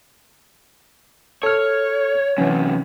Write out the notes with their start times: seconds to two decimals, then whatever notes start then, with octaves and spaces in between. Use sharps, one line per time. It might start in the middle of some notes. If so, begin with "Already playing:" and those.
1.43 A4 C#5 F6
2.38 C3 E3 F#3 C#4